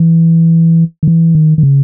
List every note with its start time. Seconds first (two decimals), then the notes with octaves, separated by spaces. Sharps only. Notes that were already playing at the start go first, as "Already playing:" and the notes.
Already playing: E3
1.03 D#3
1.08 E3
1.35 D#3
1.58 D#3
1.63 C#3